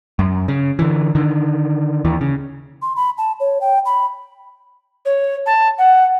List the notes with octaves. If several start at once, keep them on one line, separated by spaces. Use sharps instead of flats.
F#2
C#3
D3 E3
D3 D#3
D#2 E3
C#3
C6
B5
A5
C#5
G5
B5
C#5
A5
F#5